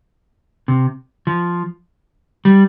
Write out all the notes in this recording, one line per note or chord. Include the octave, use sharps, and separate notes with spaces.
C3
F3
G3